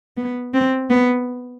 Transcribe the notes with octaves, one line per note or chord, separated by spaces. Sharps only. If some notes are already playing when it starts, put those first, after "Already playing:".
B3
C4
B3